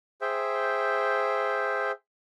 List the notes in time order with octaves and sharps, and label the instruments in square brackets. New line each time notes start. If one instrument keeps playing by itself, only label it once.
[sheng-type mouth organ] G#4 C5 E5 G5